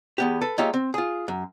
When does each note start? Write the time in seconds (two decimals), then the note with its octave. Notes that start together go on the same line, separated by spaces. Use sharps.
0.18 E2 B3 G4
0.42 A4 B4
0.58 G#3 A#3 F4 G4 C#5 E5
0.74 C4
0.94 F4 G#4
1.28 F#2